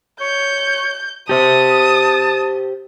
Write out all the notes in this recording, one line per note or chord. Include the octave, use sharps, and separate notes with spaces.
C#5 G6
G4 C5 A5 D#6